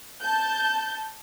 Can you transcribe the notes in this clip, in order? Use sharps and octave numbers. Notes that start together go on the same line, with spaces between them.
A5 G6